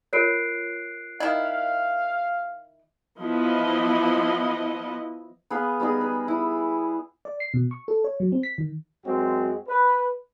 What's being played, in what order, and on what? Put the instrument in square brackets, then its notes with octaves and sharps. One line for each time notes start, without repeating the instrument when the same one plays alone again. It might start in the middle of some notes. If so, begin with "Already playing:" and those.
[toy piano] F4 A#4 C#5 [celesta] F#6 C7 D7
[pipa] D#3 E4 [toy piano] D#5 [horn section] F5
[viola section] F3 B3 E4 D#5
[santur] B3 G#4 B4 F5
G3 B3 D#4 G#4
B4
E4
[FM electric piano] D5
C7
B2
C#6
A4
C#5
F#3
C4
B6
D#3
[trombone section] F#2 G#3 C4 F#4
B4